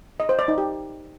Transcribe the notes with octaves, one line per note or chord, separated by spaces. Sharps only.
D#5
C5
D5
D#4
G4